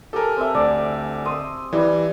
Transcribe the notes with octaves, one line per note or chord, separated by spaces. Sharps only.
G4 A4 A#4 G#5 A5
C4 E5
D2 D5
C6 D#6 E6
E3 G3